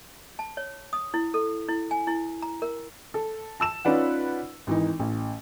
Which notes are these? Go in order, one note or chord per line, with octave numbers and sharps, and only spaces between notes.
A5
C#5
D#6
E4
A4
E4
G#5
E4
A#5
A#4
A4
A5 E6 E7
C#4 D#4 F4 B4 D5 F#5
G#1 E3 D#4
A1